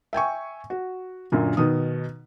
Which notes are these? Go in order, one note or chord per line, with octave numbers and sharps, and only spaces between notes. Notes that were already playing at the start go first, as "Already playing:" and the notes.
E5 G5 G#5 C#6
F#4
F#2 A#2 D3
B2 D#3 D#6